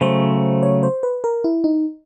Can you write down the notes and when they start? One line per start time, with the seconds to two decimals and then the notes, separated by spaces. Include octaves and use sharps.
0.01 C#3 F#3 A3 C5
0.63 C#5
0.83 C5
1.03 B4
1.24 A#4
1.44 E4
1.64 D#4